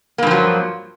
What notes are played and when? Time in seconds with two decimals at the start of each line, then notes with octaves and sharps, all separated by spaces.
0.18 A#3
0.23 G2
0.27 F3
0.31 F#3